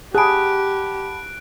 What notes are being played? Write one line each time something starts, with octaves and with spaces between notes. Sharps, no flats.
G4 G#4 F#5 A5 B5 F#6 D7